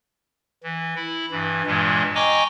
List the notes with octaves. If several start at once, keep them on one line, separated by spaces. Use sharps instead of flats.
E3
E4
G2 E3
G2 A#2 E3 G#3
D#5 G5 G#5 A#5 C#6 D6